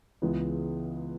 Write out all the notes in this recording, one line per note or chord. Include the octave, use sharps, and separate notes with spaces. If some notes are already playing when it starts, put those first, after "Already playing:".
C#2 C#3 E3 G#3 B3